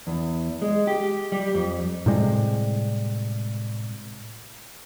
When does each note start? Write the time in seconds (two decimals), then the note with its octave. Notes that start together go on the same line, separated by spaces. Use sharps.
0.07 E2
0.62 G#3
0.87 G4
1.32 G3
1.55 F2
2.06 A2 C3 G3 G#3